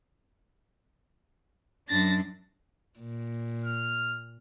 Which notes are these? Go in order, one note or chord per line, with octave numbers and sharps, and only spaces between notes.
F#2 D4 A6 A#6
A#2
F6